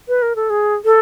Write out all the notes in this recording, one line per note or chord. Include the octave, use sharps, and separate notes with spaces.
B4
A#4
A4
G#4
A4